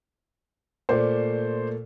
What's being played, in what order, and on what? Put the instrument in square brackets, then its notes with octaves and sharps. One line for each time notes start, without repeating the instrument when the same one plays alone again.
[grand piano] A#2 A3 [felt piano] C5 D5